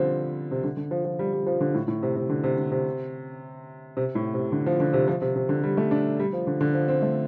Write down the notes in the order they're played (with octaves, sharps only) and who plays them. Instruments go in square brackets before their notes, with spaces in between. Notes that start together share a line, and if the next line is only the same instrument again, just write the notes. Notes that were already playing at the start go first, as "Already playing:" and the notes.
Already playing: [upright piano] D3 F3 G3 C4
C3
D3
D3
F3
F3
G3
G3
F3
D3
A2
A2
C3
C3
D3
C3
D3
C3
C3
A2
C3
D3
F3
D3
C3
F3
C3
C3
D3
G3
A3
D4
G3
F3
D3
D3
F3
C4
A3